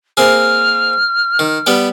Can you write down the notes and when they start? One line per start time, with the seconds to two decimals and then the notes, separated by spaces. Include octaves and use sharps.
0.17 A#3 C4 G#4 F6
1.39 D#3
1.66 G3 B3 G5